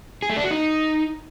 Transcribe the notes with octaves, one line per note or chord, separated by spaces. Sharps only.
G#4
A3
D4
F#4
D#4